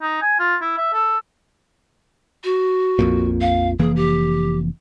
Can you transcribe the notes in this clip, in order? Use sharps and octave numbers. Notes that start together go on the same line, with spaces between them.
D#4
G#5
F4
E4
E5
A4
F#4
A#1 F2 A#2
F5
F1 E3 A#3 G#4
G4